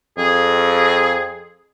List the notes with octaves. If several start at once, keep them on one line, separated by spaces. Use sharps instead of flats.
F2 G#4